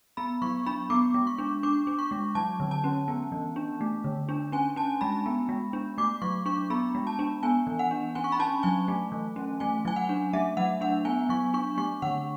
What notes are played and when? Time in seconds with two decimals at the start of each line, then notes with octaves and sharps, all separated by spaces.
0.17 B3 B5
0.42 F#3 C#6
0.66 D4 B5
0.90 B3 D6
1.14 G#3
1.27 C#6
1.38 D4
1.63 D4 D6
1.87 D4
1.99 C#6
2.11 G#3
2.35 F#3 A5
2.60 D3
2.71 A5
2.84 C#4
3.08 B3
3.32 E3
3.56 D4
3.81 A3
4.04 D3
4.29 D4
4.52 C#4 G#5
4.76 C#4 A5
5.01 G#3 B5
5.26 B3
5.49 G#3
5.73 D4
5.98 A3 D6
6.22 F#3 C#6
6.46 D4 C#6
6.70 B3 B5
6.95 G#3
7.07 A5
7.19 D4
7.43 B3 G#5
7.67 E3
7.79 F#5
7.91 D4
8.15 C#4 G#5
8.24 C#6
8.32 B5
8.40 C#4 A5
8.63 F#3 G#5
8.88 A3
9.12 E3
9.36 C#4
9.60 A3 G#5
9.85 F#3 G#5
9.96 F#5
10.09 D4
10.33 A3 E5
10.57 F#3 F#5
10.81 D4 F#5
11.05 B3 G#5
11.29 F#3 C#6
11.54 D4 C#6
11.78 A3 C#6
12.02 D3 F#5